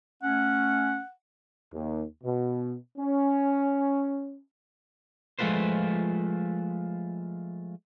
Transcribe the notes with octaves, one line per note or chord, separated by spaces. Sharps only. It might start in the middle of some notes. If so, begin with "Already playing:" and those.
A3 C#4 F#5
D#2
B2
C#4
F3 G#3 A3 F4 B4 C5